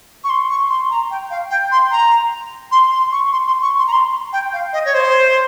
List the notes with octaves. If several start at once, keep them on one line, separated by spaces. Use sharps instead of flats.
C#6
C6
C#6
C6
A#5
G5
F5
G5
C6
A#5
C6
C6
C#6
C6
C6
C#6
C6
A#5
C6
G5
F5
D#5
C#5
C5